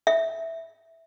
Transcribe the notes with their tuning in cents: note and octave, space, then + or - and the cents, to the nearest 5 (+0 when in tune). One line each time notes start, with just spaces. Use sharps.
E5 -5